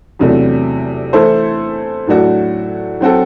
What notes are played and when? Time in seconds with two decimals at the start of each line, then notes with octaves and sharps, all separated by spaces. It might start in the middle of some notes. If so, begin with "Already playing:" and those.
0.19 E2 C3 F#3 A3 D4
1.13 E3 A3 E4 A4 C5
2.07 A2 F#3 A3 D4 F#4
3.01 F#3 C4 F#4 A4